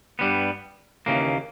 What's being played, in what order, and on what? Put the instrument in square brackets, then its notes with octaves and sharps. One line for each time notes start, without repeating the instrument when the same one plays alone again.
[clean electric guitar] G2 G3 B3
D#2 C#3 E3 A#3